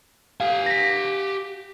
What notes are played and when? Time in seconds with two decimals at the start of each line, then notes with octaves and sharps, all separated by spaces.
0.40 G4 F5 G#5
0.66 A#6 B6